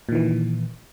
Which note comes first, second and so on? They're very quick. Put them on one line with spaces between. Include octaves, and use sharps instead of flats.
A#2 D#3 E3